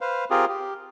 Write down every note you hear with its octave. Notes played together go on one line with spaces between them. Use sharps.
B4 C5 F5
C4 F4 G4 G#4 A#4
G4